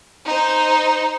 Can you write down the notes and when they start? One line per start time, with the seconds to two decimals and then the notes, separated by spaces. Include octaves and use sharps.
0.25 D#4 C5